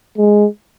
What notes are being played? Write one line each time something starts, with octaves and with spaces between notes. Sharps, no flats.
G#3